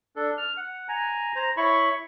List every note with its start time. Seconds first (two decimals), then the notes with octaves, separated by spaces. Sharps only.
0.16 D4 A4
0.37 F6
0.57 F#5
0.89 G#5 A#5
1.35 C5 A#5
1.57 E4 C#5 B5 C#6